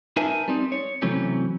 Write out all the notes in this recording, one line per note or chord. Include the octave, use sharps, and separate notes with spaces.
D#4 A#4 B4 E5 G#5 A5
G3 C4 D#4
C#5
C3 E3 F#3 A3 C4 C#4